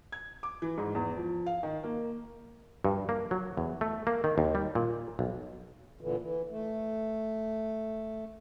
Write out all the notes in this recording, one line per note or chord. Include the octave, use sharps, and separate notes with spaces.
G#6
D6
E3
G#2
E2
F3
F5
D#3
A#3
G2
A#3
F#3
E2
A3
A#3
D#3
D#2
G3
A#2
B1
A#2 D3 E3
E3
A3